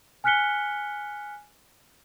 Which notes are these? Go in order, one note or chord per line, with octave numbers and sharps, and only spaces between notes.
G#5 F6 F#6 B6 C#7 G7